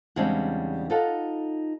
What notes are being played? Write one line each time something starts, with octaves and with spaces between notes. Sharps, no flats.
E2 C#3 G3 G#3 C4 D4
D#4 F4 A4 F#5